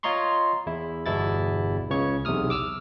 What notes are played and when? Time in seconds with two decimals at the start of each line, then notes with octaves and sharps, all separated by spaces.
0.03 F4 C#5 D#5 A#5 C6 C#6
0.67 E2 E4
1.06 G1 E2 B2 E4 A6
1.90 C#2 C#3 C#5 C#6
2.25 B1 E2 C3 D#6 F6
2.50 D6 E6 F6